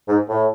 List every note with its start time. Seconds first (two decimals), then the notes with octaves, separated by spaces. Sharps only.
0.08 G#2
0.29 A2